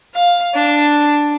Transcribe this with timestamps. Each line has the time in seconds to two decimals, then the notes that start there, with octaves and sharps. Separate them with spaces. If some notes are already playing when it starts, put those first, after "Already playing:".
0.14 F5
0.54 D4